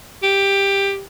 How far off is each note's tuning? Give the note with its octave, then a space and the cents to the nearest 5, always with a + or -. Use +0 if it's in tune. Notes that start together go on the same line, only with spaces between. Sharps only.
G4 +10